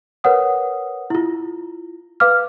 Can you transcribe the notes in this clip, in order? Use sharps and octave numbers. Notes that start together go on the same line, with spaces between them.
A#4 B4 C#5 F#5 D#6
E4 F4
B4 F5 D6 F6